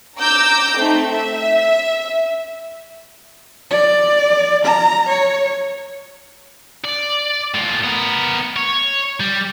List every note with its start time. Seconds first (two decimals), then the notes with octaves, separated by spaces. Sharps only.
0.19 A#5 D6 E6 G6
0.77 A3 C4 D#4
1.07 E5
3.70 D5
4.65 A#5
5.08 C#5
6.85 D5
7.54 A2 F4
7.84 B3 A#4
8.56 C#5
9.20 G3